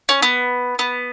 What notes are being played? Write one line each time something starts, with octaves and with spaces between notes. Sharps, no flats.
C#4
B3
B3